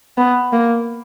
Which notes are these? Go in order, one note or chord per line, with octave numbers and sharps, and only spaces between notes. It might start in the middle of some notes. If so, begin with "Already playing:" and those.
B3
A#3